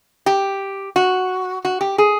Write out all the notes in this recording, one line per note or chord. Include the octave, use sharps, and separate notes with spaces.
G4
F#4
F#4
G4
G#4